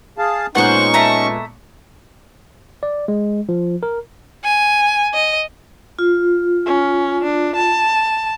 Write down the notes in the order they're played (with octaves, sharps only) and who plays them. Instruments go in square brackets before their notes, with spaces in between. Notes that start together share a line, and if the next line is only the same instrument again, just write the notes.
[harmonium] G#4 F5 A5
[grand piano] A#2 G#3 B3 [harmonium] C#4 D#4 [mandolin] C5 F#5 [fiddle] C#6
[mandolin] A3 E5 A#5
[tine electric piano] D5
G#3
F3
A#4
[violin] G#5
D#5
[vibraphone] F4
[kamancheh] C#4
D4
A5